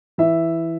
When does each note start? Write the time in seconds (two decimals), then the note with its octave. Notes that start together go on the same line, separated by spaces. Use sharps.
0.18 E3 E5